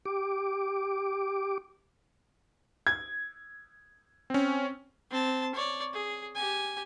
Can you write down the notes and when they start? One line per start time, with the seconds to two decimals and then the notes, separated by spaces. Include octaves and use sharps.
0.05 G4 D6
2.87 G#6
4.30 C4 C#4
5.11 C4 A5
5.54 C#5 D5
5.93 G#4
6.35 G4 G#5